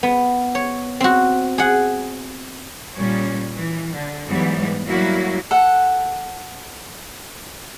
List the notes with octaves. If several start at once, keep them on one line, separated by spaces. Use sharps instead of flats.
B3
C#5
C4 F#4
G#4 F#5
A#2 G3 C#4
E3
D3
G#2 E3 F#3 G3 B3
F#3 G3 A#3 E4 F#4
A4 F#5